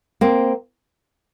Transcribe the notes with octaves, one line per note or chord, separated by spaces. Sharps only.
A#3 C4